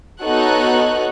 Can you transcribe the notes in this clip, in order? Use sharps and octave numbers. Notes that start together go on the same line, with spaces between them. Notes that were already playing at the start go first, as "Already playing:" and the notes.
B3 D#4 F#4 A4 C#5 F#6